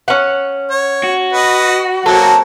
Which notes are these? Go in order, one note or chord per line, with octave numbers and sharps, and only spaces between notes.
C#4 F#5
C#5
F#4
B4 D#5
F#3 A#3 C4 A4